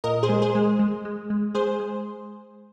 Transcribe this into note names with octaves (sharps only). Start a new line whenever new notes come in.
A#2 A#4 D#5
G#4 C5
G#3
G#4 C5
G#3
G#3
G#3
G#3
G#3 G#4 C5
G#3